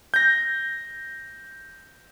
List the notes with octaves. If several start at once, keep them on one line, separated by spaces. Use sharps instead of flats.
G6 A#6